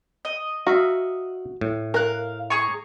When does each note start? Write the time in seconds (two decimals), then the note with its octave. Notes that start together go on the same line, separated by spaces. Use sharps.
0.25 D#5
0.67 F#4 E5 F5 A#5
1.61 A2
1.94 A#4 F5 F#6
2.50 G#4 A#5 C#6